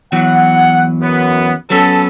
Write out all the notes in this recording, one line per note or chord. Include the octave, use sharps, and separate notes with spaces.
E2 E3 F#3 F#5
F#2 B3
F#3 B3 C#4 A4